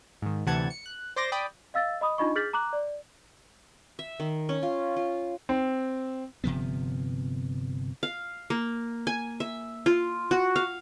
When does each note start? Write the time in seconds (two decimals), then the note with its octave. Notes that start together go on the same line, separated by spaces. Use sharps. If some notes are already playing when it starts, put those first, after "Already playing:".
0.22 G#2 D#3
0.46 D2 C3 E3 F#5 A5 G#6
0.70 C#7
0.86 F#6
1.16 C5 D5 C6 D6 A#6
1.32 D5 G5 B5 D#6
1.74 D#5 F5 E6 A6
2.01 D#5 B5 D#6
2.18 D4 D#4 F4 D#5 B5 C#6
2.35 G#4 F6 G6 A6 B6 F#7
2.53 A#5 D6 F#6 F#7
2.73 D5
3.99 E5
4.20 D#3
4.49 C#4
4.63 F4
4.96 F4
5.49 C4
6.44 G1 C3 F3 B3
8.03 F5
8.50 A#3
9.07 G#5
9.40 E5
9.86 F4
10.31 F#4
10.56 F5